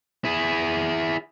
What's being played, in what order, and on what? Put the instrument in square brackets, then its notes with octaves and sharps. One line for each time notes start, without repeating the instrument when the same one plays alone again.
[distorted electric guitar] E4 G#4